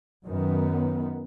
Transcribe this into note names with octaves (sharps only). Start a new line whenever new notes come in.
F#2 D#3 B3